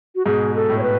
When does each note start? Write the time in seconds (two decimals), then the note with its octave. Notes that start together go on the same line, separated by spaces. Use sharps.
0.16 F#4
0.26 G#2 B2 G#4
0.55 A4
0.70 A2
0.79 C#5
0.83 B4